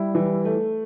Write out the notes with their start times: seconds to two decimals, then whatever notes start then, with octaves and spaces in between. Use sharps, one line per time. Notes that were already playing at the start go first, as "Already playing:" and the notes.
Already playing: G3 E4
0.15 E3
0.45 A3